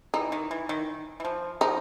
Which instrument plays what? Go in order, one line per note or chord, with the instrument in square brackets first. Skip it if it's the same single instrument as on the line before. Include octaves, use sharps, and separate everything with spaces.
[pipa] E3 [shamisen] D#4
[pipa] D#3
E3
D#3
E3
F3
[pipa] F3 [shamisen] D#4